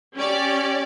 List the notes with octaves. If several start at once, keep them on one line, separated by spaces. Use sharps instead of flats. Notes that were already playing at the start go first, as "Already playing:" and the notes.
C#4 G4 D5